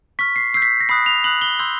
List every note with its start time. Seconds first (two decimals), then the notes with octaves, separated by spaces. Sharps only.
0.19 C#6 F6 B6
0.36 C7
0.54 C#6 E6 G6 C7
0.62 B6
0.81 A#6
0.89 B5 D#6 F#6 C7
1.06 F7
1.24 B5 D#6 F#6 F#7
1.42 G7
1.59 C6 E6 G6